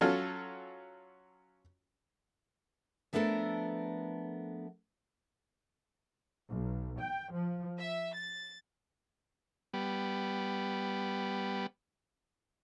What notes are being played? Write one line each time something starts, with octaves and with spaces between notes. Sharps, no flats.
F#3 C#4 F4 A4
F3 A3 B3 D4 A4 A#4
B1
G5
F3
E5
A6
G3 B3